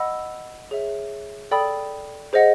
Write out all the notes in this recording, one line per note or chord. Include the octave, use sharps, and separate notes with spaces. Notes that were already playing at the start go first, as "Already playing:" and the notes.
Already playing: D#5 F#5 B5 E6
G#4 C#5 E5
A4 D5 G5 B5 D#6
G#4 C5 D#5 F#5